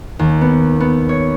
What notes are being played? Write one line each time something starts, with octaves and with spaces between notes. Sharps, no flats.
D#2
B3
B3
C#5